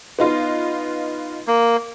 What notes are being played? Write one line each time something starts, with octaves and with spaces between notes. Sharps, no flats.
B3 D#4 F4
A#3